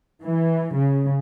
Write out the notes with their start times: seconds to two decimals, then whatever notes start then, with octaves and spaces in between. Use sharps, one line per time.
0.23 E3
0.75 C#3